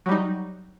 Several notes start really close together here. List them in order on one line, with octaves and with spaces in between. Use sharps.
F#3 G3 D#4